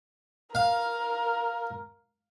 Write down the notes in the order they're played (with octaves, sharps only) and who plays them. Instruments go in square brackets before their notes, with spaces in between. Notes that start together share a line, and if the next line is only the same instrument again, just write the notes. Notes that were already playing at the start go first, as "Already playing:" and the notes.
[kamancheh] A#4 [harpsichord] F5